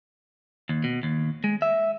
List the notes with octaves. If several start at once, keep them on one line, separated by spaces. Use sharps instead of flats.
D#2
B2
D#2
G#3
E5